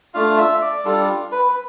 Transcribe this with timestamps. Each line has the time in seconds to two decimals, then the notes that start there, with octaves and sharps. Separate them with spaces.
0.14 A3 D4 F4 F5
0.38 E5
0.61 D5
0.85 G3 D4 F4 A4
1.32 B4